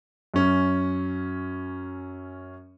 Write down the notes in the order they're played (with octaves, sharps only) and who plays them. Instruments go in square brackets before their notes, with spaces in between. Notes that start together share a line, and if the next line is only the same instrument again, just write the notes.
[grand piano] F#2 C#4